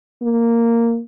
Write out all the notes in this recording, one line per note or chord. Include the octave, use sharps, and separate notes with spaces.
A#3